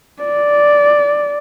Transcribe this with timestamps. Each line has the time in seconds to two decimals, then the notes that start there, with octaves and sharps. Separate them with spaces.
0.23 D5